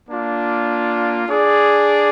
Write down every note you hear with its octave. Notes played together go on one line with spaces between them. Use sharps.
A#3 D4 F4
D4 G#4 D5